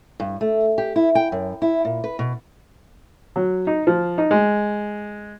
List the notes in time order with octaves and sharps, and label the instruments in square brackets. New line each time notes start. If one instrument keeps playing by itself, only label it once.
[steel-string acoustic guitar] G2
A3
G4
E4
G5
F#2
E4
A#2
B4
B2
[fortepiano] F#3
D#4
F3
D#4
G#3